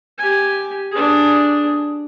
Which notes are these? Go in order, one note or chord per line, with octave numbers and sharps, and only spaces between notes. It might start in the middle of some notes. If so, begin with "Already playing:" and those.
G4 G#5
D4 G#4